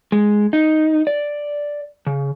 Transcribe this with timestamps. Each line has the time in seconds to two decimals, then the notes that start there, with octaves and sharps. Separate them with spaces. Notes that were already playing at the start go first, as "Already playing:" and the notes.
0.12 G#3
0.53 D#4
1.07 D5
2.07 C#3